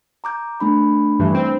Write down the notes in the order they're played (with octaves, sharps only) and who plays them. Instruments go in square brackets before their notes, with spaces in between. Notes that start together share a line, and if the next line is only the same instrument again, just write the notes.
[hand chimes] A#5 D6 G6
A3 D4 B5
[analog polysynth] G2 E3
C4